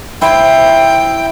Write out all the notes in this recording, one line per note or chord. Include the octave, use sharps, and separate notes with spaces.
E4 C5 G5